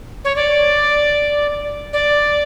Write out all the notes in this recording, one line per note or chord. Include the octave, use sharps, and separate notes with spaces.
C#5
D5
D5